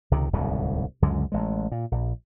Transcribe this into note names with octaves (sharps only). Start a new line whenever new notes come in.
C#2 C3 D#3
D1 C2 G#2 B2
C#2 F#2 D3 G#3
A1 G#3
A#2
A#1